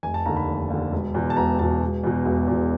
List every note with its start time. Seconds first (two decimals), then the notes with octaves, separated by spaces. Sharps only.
0.03 F1 G#5
0.14 A5
0.26 D#2 D3 A#5
0.36 B5
0.47 F1
0.70 D#2 D3
0.92 E1
1.14 E2 B2
1.30 A5
1.37 E1 A#5
1.59 E2 B2 A5
1.81 E1
2.03 E2 B2
2.26 E1
2.48 E2 B2